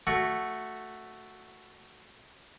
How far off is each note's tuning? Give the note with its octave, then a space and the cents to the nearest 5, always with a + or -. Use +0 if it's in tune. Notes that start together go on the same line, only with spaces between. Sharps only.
A3 +0 F#4 +0